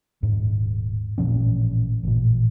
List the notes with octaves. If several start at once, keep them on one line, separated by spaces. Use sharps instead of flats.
D#1 G#2
A1 A#2 F3 C#4
A1 A#2